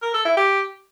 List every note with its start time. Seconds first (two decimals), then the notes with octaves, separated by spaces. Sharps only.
0.02 A#4
0.14 A4
0.25 E4
0.37 G4